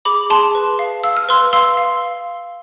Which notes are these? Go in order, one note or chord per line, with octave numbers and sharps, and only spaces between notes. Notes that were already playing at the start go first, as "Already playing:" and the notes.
G#4 B5 D6
G#4 A5 C6
B4
F5
F5 E6
F6
B4 C6 E6
F5 C6 E6
F5